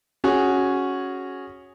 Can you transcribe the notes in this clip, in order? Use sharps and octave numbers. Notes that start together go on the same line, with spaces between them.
C#4 F#4 G#4